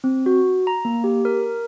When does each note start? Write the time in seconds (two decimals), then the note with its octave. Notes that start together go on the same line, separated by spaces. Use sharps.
0.04 C4
0.26 F#4
0.67 A#5
0.85 A#3
1.04 G4
1.25 A#4